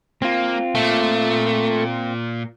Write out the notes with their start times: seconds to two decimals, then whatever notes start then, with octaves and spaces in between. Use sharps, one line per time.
0.22 A#3 C4 F4
0.75 A#2 A3